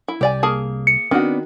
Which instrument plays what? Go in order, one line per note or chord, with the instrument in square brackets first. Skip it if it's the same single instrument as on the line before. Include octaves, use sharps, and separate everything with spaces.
[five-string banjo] E4
[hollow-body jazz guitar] C2 [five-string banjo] G4 D5 G#5
[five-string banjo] A#3 G#4 A5
[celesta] C#7
[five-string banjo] D#3 F#4 [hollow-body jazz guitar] B3 C4 D4